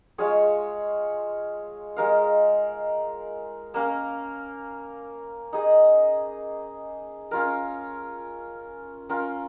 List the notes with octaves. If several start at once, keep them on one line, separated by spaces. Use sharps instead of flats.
G#3 F4 G#4 C#5
G#3 D#4 A#4 F5
A#3 C#4 A#4 F5
D#4 G#4 D#5
C#4 F4 A#4
C#4 F4 A#4